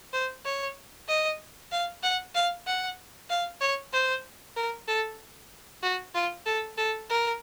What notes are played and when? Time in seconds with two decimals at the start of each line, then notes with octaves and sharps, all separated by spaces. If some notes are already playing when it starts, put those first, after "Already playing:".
0.13 C5
0.45 C#5
1.08 D#5
1.72 F5
2.03 F#5
2.35 F5
2.67 F#5
3.30 F5
3.61 C#5
3.93 C5
4.56 A#4
4.88 A4
5.83 F#4
6.15 F4
6.46 A4
6.78 A4
7.10 A#4